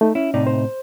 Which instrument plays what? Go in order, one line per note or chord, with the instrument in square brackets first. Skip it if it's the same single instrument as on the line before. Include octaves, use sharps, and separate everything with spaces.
[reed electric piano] A3 D#4
[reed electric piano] C#4 [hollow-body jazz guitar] E4
[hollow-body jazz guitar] A2 C3 D#4 [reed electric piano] D5
[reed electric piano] C5